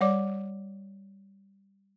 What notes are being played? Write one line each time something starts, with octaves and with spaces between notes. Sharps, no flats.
G3 C#5 D5 D6